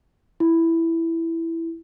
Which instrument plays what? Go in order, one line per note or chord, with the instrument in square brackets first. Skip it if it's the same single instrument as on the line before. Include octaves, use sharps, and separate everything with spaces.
[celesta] E4